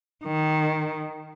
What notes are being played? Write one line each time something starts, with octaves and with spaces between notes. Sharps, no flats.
D#3